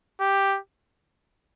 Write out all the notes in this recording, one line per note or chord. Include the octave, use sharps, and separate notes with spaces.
G4